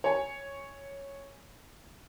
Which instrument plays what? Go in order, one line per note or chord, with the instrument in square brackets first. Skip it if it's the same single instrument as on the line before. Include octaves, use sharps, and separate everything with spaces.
[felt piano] C#5 G#5